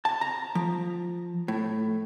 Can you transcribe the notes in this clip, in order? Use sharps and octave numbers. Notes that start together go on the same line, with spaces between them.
A5
A#5
F3
A2